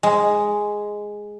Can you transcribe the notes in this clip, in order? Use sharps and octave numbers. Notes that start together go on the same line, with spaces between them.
G#3